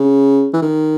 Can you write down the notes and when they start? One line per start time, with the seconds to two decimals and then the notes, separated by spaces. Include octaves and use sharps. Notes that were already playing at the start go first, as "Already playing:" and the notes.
Already playing: C#3
0.53 E3
0.62 D#3